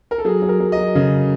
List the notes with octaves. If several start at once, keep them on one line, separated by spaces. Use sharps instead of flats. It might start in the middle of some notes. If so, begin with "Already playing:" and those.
A#4
A4
F#3 G#4
F#3
A#4
F#3
F#3 D#5
C#3